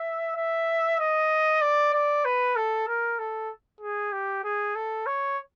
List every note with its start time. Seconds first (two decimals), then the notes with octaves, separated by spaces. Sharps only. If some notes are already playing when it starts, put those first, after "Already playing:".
Already playing: E5
0.37 E5
1.00 D#5
1.62 D5
1.94 D5
2.25 B4
2.57 A4
2.88 A#4
3.19 A4
3.81 G#4
4.13 G4
4.44 G#4
4.76 A4
5.07 C#5